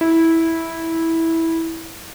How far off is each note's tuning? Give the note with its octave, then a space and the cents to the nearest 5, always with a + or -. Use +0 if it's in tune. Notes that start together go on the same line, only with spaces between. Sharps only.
E4 -10